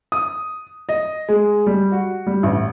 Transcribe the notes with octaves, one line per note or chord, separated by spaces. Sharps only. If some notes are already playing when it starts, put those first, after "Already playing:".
D#6
D#5
G#3
G3
F#4
G3
A1